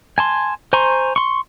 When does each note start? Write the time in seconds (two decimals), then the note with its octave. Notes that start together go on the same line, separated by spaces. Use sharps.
0.18 G#5 A5 C6
0.73 C5 G#5 A#5 C6 C#6
1.16 C6 C#6